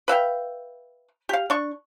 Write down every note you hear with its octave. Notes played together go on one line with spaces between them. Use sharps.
B4 E5 F5 G5
G4 F5
D4 C#6